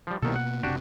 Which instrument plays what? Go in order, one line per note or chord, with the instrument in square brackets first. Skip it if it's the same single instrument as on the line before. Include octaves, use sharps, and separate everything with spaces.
[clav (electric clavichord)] F3 G3
[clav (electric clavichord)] C2 D#3 A4 [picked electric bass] B2 A#3 B3
[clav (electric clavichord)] F#5
[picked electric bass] F#1 C3 [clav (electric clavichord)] D4 F#4 G4